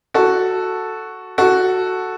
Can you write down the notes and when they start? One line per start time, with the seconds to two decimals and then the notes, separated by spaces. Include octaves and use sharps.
0.14 F#4 A4
1.38 F#4 A4